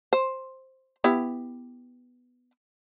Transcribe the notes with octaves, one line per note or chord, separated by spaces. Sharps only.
C5
B3 E4 G4